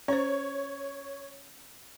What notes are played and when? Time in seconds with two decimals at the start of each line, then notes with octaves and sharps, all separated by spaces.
0.08 C#4 C5 C#5